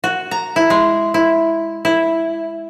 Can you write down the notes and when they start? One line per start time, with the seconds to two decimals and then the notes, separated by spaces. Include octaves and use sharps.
0.04 F#4
0.31 A#5
0.56 E4
0.70 G#3
1.14 E4
1.85 E4